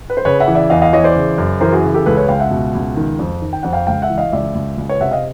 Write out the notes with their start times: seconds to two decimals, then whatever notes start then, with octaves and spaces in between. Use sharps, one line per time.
0.10 B4
0.17 C5
0.25 C#3 B4 C#5
0.40 E5 F#5
0.48 E3
0.55 D5 E5
0.70 E2 D#5 F5
0.81 D#5 F5
0.93 E3 C#5 D#5
1.04 C5 D5
1.16 C#3
1.38 F#2
1.61 E3 A#4 C5
1.72 F#4 G#4
1.84 C#3
1.94 G4 A4
2.06 C#2 A4 B4
2.17 B4 C#5
2.28 C#2 F5 G5
2.40 E5 F#5
2.51 B2
2.75 C#2
2.97 D#3
3.19 F2
3.42 D#3
3.53 G5
3.63 F2 F#5
3.73 F5 G5
3.87 C#2 F5 G5
4.02 E5 F#5
4.10 E3
4.18 D#5 F5
4.32 C#2 D5 E5
4.55 C#2
4.78 C#2
4.89 B4 C#5
5.01 C3 E5 F#5
5.12 D#5 F5